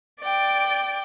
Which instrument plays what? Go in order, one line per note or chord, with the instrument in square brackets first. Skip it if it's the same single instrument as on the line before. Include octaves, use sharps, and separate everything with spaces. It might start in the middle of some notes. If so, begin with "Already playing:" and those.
[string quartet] D5 G5